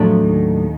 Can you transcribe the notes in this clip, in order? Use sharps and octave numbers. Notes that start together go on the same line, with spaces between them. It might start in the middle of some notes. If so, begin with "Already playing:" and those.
Already playing: F2 A2 F3 F#3 A3 D4
D#2 D#3